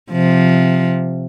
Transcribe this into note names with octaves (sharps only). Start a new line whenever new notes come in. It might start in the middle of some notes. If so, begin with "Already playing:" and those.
C3 F3